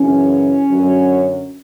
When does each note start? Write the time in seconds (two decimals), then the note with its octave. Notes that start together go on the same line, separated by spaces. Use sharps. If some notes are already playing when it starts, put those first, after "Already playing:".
Already playing: F#2 C#3 E3 C#4
0.68 F#2 D3 F#3